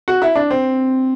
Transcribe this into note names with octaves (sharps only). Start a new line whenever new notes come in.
F#4
E4
D4
C4